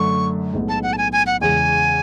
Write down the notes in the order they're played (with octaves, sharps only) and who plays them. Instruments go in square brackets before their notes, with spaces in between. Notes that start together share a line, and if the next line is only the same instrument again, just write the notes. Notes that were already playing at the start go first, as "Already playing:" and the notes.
Already playing: [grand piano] F#2 D3 A3 [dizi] C#6
[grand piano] B1 A2 G#3 B3
[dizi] A5
F#5
A5
G#5
G#5
F#5
[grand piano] E2 C#3 G#3 [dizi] G#5